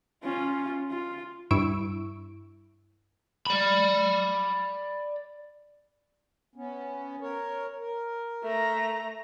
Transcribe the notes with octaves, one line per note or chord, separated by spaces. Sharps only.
C#4 F4
F4
G2 E4 C#6 E6 D7
D5 B5
B3 C#4
A#4 C#5
A#4
A3 A#5